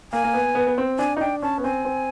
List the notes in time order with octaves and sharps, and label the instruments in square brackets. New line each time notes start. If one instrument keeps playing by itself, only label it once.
[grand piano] A#3 [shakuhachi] G#5
[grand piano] A#3
B3
B3
B3
C4
[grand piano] D4 [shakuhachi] G#5
[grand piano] D#4
[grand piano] D4 [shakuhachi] G5
[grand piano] C#4 [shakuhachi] A5
[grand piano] B3
[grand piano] C4 [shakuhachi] G#5
[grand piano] C4